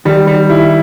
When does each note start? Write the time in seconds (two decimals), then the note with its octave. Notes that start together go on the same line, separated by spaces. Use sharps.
0.05 D#3 G3
0.27 G3
0.50 E4